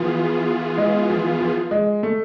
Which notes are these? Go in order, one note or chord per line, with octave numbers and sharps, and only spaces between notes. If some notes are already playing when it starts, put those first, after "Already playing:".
Already playing: E3 F3 B3 F4 G#4
G#3
F3
F3
G#3
A3